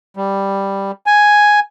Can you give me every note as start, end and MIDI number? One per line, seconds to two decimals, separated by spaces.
0.17 0.91 55
1.06 1.60 80